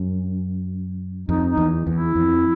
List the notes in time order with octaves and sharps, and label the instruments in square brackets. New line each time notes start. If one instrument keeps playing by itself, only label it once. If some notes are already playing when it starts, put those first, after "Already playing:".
Already playing: [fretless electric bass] F#2
[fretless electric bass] F2 [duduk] D#4
[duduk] D#4
[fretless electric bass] E2
E2
[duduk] E4
[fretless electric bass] F2